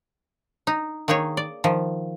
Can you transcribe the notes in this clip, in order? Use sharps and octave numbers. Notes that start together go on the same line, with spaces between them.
D#4
D#3 A#3 D#4 G#4 C#5
D5
D#3 F3